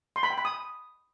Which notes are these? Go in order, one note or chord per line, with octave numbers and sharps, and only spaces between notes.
C6
B5
G5
B5
D#6